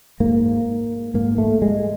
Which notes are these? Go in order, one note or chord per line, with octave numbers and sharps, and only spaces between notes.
G#2 A#3
G#2 A#3
A3
G#3